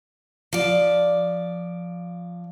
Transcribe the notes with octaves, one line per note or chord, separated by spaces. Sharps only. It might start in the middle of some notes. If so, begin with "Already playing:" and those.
F3 D5